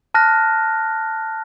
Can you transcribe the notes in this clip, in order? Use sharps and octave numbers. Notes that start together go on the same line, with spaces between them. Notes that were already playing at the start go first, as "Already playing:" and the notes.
A5 F6 F#6 A#6